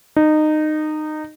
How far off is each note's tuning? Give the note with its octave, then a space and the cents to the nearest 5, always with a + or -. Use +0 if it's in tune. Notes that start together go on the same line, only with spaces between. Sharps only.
D#4 -20